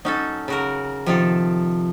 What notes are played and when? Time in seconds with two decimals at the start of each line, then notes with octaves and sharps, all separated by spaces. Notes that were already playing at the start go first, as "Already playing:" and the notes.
0.05 F#3 C#4 D#4 A4
0.48 C#3 F#4 A#4
1.06 C3 D#3 F3 A4